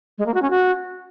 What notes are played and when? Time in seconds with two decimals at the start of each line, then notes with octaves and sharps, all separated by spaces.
0.18 G#3
0.26 A#3
0.34 F#4
0.42 C#4
0.50 F#4